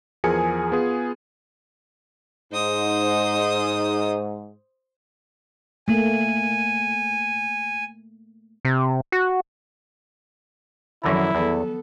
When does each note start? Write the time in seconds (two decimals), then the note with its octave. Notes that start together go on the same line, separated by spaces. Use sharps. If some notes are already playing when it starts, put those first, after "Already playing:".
0.24 E2 F3 G#4 A#4 G#5 C#7
0.72 B3 F4 G#4
2.53 G#2 D#4 C5 D#6
5.88 A3 A#3 G#5
8.65 C3
9.12 F#4
11.04 F#2 D3 D#3 F3 F#3 E4 A#5
11.35 E2 B3 A4